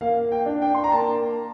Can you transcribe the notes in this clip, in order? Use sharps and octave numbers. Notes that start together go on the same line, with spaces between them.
A#3 F5
G5
D4
G5
C6
A#5
A#3 A5